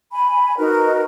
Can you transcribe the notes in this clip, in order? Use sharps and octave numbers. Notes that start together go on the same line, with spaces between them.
G#5 B5
D#4 F#4 A#4 B4